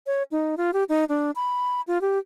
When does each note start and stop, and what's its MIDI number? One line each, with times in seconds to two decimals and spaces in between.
0.07 0.23 73
0.31 0.55 63
0.57 0.71 65
0.74 0.84 67
0.89 1.04 63
1.09 1.31 62
1.36 1.81 83
1.88 2.01 65
2.01 2.18 67